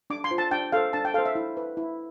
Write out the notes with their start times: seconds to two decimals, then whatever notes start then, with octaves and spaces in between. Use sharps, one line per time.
0.10 D4 D6
0.24 C6
0.31 F4 C5
0.38 A5
0.51 D4 G5
0.72 A4 C5 F5
0.93 D4 A5
1.05 G5
1.14 A4 F5
1.18 C5
1.25 E5
1.35 E4
1.57 B4
1.77 E4